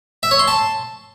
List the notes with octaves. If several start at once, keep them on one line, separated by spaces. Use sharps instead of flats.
E5
C#5
C6
A5